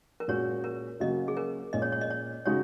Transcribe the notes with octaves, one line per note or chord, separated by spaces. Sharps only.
A#4
A#2 G#3 C#4 F#4 C#5
A#4
C#3 F#3 A#3 F#4 D#5
G#4
A#4
A#2 G#3 C#4 D#5
C#5
C#5
D#5
C#5
C#3 G#3 D#4 F#4 C#5